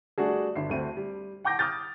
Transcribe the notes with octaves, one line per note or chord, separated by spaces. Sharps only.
G3 A3 D4 F#4 G#4
G1 D3 E5 C7
D2 A3 C4 D#7
G3
F#5 G5 D6 G6 A#6
D6 D#6 F6 G6 A6